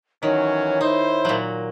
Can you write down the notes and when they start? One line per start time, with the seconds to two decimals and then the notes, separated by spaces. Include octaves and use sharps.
0.23 D#3 E3 F#3 C#4 C#5
0.81 D#4 E4 C5
1.25 A#2 F#3